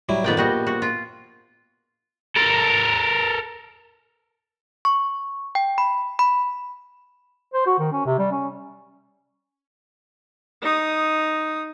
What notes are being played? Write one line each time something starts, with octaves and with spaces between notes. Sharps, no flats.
F#3 G3 E4
A#1 F2 D#3 B3 D5 G5
A#1 G3 F#4 D#5
F#4
F4
A4 A#4
C#6
G5
B5
B5
C5
F#4
D#3
C#4
C3
G3
C#4
D#4 D#6